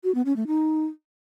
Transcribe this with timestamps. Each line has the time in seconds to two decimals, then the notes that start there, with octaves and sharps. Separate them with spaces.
0.04 F#4
0.15 B3
0.26 C#4
0.36 A3
0.47 D#4